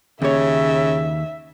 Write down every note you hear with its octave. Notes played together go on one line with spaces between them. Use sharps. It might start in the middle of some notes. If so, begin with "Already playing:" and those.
D#2 C#3 C#5 E5